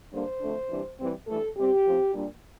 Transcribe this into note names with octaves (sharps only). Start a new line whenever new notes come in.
G2 D3 G3 A#3 D4 C5
F2 D3 A3 D4
C3 E3 G3 D4
C3 E3 G3 C4
G2 E3 A3 A4
C3 G3 C4 G4
A2 F3 C4
A#2 G3 D4